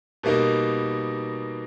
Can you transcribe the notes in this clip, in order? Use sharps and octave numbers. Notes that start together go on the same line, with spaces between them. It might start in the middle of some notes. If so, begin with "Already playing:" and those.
B2 G3 A#3 D#4 B4